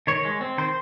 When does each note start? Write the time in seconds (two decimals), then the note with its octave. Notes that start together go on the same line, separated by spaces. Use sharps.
0.07 D#3 C#5
0.25 G#3
0.41 C4
0.58 D#3 C5